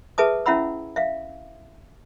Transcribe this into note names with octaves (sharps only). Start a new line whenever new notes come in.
G#4 B4 E5 A5 D#6
C#4 E4 E5 F#5 B5 E6
E5 F5